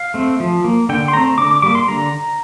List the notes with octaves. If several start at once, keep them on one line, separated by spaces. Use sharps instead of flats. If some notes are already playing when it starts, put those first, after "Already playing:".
Already playing: F5
A3 C4
F3
A#3
D3 G5
C6
A3 C4 A#5
D3 D6
D6
G3 A#3 D6
C6
D3 A#5